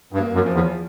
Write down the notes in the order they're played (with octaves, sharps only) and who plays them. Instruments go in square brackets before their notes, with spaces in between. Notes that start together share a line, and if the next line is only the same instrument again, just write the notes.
[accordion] G2
[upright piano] A#3
[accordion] F#2
[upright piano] F3
[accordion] E2